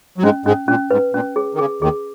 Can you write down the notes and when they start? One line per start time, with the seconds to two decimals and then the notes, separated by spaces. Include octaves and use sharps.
0.18 F#3
0.23 G#2 G#3 C#4
0.45 G#2 G#3 C#4
0.68 A#2 C#4
0.91 G#2 B4
1.14 A#2 C#4
1.36 G#4
1.54 D#3
1.59 C#3 G#4
1.82 D#2 D#3 G#4